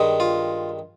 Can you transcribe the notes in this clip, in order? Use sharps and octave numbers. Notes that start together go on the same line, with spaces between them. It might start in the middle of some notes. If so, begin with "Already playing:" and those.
Already playing: G2 D#3 G#3
F4